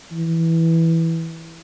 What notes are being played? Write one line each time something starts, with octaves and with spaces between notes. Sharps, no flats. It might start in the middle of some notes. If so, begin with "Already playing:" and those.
E3